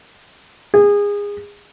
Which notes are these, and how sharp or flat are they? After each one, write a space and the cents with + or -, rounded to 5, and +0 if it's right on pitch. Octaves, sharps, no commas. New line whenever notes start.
G#4 -25